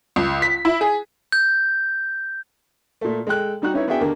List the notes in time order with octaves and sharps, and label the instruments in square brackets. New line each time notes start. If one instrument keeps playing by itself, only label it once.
[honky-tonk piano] C#2
B6
E4
G#4
[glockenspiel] G6
[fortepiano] A#2 A3
G#3 A4 G5 F#6
G3 D#4 F#4 F#6
C#4 D#4 E4 B4 C#5
B3 D4 F#4 G#4 E5 G5
D#2 D3 A#3